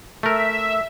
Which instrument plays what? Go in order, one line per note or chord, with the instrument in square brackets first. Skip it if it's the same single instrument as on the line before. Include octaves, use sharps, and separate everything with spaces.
[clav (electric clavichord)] A3 A#4 [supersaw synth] E5